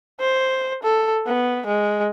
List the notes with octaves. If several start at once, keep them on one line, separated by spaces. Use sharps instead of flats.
C5
A4
B3
G#3